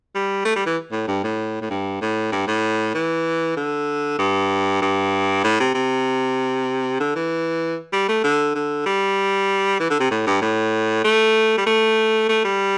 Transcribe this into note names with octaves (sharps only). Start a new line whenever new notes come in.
G3
A3
G3
E3
A2
G2
A2
A2
G2
A2
G2
A2
E3
D3
G2
G2
A2
C3
C3
D3
E3
G3
A3
D3
D3
G3
E3
D3
C3
A2
G2
A2
A3
G3
A3
A3
G3